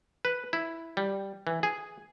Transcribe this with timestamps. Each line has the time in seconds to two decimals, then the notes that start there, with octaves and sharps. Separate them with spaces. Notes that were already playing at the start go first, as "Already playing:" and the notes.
0.25 B4
0.53 E4
0.97 G3
1.47 E3
1.63 G#4